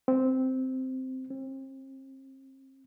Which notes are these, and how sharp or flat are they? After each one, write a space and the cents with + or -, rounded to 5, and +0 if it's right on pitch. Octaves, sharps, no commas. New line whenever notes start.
C4 -10
C4 +35